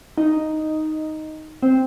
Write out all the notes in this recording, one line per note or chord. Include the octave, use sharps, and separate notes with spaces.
D#4
C4